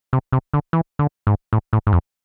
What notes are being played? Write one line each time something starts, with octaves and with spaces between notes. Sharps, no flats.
C3
C3
D3
E3
D3
G#2
A2
A2
G#2
F2